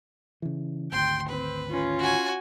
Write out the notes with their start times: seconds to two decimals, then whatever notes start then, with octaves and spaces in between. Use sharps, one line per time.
0.42 C#3 E3
0.92 G#1 D2 G5 C6
1.28 C4 B4
1.69 C#4 F4
1.98 F#4 G#5